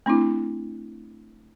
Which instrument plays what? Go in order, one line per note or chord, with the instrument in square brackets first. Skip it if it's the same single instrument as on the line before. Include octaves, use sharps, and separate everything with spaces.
[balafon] A3 C4 D4 E4